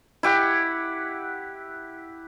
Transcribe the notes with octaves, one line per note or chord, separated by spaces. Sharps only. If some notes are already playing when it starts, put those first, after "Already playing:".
E4 G4 F#5